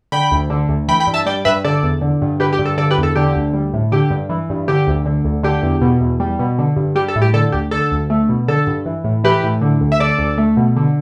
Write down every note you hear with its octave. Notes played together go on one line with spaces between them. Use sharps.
D3 G5 B5
D2
D3
D2
E3 G5 B5
G5 B5
G2
E5 A5
G3 D5 G5
G2 B4 E5
D3 A4 D5
E2
D3
G2
D3 G4 B4
G4
G2
A4
D3 A4 D5
G4 B4
E2
A4
D3 G4
D2
G3
A2
D3 G4
G2
E3
G2
D3 G4
D2
D3
D2
D3 G4
E2
B2
E2
G3
B2
D3
G2
G3 G4
A4
A2
G4
D3 A4
D2 G4
D3 A4
D2
A3
B2
D3 A4
G2
E3
A2
E3 G4 B4
A2
D3
D2
E5
D3 A4 D5
D2
A3
B2
D3